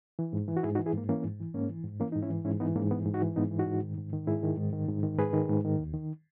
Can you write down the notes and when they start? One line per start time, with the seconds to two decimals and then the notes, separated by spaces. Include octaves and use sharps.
0.19 E3
0.33 G#2
0.48 E3
0.57 F#4
0.63 G#2 E4 G#4
0.75 D#4 F#4
0.79 E3
0.86 E4 G#4
0.93 G#2 A#3
1.09 E3 A#3 C#4
1.24 G#2
1.40 E3
1.54 G#2 A#3 C#4
1.69 E3
1.84 G#2
2.00 E3 A#3 C#4
2.12 G#2 D#4
2.22 C#4 E4
2.30 E3
2.45 G#2 C#4 E4
2.60 E3 B3 D#4
2.75 G#2 A#3 C#4
2.91 E3 B3
3.06 G#2
3.13 D#4 F#4
3.22 E3
3.36 G#2 B3 D#4
3.51 E3
3.59 D#4 F#4
3.67 G#2
3.83 D#3
3.97 G#2
4.13 D#3
4.27 G#2 E4 G#4
4.43 D#3
4.57 G#2
4.73 D#3
4.88 G#2
5.03 D#3
5.18 G#2 G#4 B4
5.33 D#3
5.49 G#2
5.65 D#3
5.79 D#2
5.94 D#3